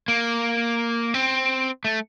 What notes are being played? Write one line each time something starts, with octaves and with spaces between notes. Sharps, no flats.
A#3
C4
A3